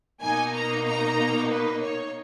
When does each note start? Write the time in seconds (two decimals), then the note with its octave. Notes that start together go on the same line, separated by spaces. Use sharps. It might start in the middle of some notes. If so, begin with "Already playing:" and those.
0.21 B2 A#3 D#4 G#5
0.54 A#5
0.86 A#5
1.49 B4
1.81 C#5